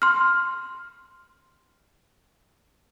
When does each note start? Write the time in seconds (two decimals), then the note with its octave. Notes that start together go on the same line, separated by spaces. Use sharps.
0.02 C6 F6